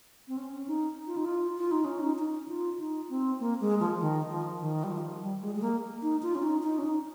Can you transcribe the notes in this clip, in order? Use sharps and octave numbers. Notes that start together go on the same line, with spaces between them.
C4
C#4
D#4
F4
D#4
F4
F4
D#4
C#4
D#4
D#4
F4
D#4
C4
A#3
G#3
F3
D#3
F3
D#3
G3
F3
G3
G#3
G#3
A#3
D#4
F4
C#4
D#4
D#4
C#4
D#4